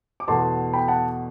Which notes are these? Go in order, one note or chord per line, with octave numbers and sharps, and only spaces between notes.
D6
E2 B2 A3 A5 C6
G5 B5
F#5 A5